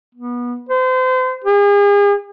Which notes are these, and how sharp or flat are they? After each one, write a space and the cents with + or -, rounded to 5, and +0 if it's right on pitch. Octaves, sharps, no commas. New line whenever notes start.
B3 -25
C5 -35
G#4 -40